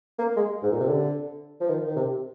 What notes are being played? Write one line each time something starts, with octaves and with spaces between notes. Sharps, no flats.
A#3
G#3
G#2
A#2
C3
D3
F3
D#3
D#3
C3